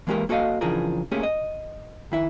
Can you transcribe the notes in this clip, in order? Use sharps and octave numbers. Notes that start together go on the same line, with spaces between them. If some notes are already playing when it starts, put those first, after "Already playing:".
E3 G#3 A#3 D#4 G4 A#4
A#3 F#4 A4 A#4 D#5 F5
C#3 E3 F3 D4 G#4 A#4
A3 A#3 C#4 G4 G#4
D#5
D#3 E4 E5